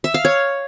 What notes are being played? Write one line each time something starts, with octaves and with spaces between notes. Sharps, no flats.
E5
F5
C#5